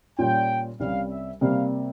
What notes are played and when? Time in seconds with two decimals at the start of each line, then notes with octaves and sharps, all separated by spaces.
0.18 A#2 G3 C#4 F4 G5
0.80 C2 C3 G3 C#4 F5
1.11 E5
1.41 C3 G3 A#3 F5